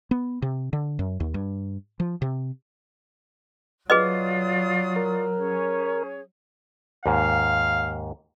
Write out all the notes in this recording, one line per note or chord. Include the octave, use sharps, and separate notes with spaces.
B3
C3
D3
F#2
D#2
G2
F3
C3
F#3 F4 G#4 B4 D5 D#5 D#6
A#4
C#4 G#4 C#5
D#2 G#2 F5